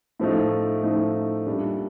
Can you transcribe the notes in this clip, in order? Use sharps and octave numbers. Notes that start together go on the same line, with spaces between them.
A2 F3 A3 D#4
A2 F3 A3 D#4
A#2 G3 D4